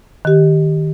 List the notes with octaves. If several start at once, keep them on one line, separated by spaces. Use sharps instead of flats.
D#3 G4